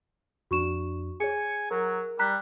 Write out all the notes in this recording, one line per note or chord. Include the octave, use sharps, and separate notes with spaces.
F2 D4 F#4 C#6 E7
G#4 C#5 G#5 C#7
F#3 A#4
G3 A#5 F#6 B6